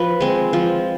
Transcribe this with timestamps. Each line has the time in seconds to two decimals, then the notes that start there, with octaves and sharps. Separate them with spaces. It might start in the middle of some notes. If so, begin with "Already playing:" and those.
Already playing: F3 B4
0.20 G#3 C4
0.53 F3